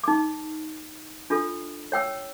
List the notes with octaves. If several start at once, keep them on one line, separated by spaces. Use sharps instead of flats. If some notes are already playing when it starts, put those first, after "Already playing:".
D#4 D6
D4 F4 A4
C#5 G5 E6